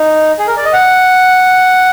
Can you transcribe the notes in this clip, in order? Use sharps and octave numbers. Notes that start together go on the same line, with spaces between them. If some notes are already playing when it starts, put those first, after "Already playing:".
Already playing: D#4
G#4
A#4
D5
D#5
F#5